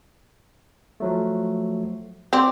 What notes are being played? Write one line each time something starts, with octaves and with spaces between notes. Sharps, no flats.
F3 F#3 A3
C4 D5 D6